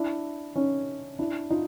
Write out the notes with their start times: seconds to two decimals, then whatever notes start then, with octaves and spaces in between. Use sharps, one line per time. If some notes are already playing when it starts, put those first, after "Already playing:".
Already playing: D4 E4
0.56 C#4 D#4
1.19 D4 E4
1.50 D#4 F4